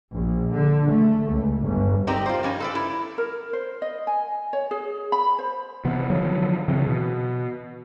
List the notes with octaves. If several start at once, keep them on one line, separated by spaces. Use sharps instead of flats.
A#1
D3
A3
C#2
G1
C4 D#4 G4 A#4 D5 G5
F4 C5
F3 G3 C#4 D#4 G#5
A4 B4 D5
E4
A#4
C5
D#5
G#5
C#5
G#4
B5
C5
C3 E3 B3
D3 D#3 F3 F#3
C#3 E3 C4
B2